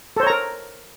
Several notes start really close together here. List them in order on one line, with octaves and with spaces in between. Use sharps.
A4 C5 C#5 A#5 A#4